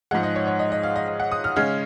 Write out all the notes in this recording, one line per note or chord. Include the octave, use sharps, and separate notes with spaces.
G#2 F3 G#3 F#5
D#5
C#5
C#5
D#5
D#5
F5
D#5
D#5
F#5
D#6
F6
C#3 G#3 C#4 F6